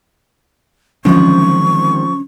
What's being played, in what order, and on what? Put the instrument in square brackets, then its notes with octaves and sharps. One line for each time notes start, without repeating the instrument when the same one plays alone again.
[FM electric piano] D3 F#3 C#4 [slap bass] D#3 G#3 C4 [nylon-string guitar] F3 [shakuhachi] C#6